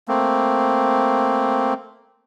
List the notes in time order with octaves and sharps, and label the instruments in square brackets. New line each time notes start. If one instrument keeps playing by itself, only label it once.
[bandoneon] A3 A#3 C4